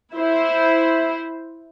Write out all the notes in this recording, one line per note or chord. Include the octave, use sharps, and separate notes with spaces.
E4 C5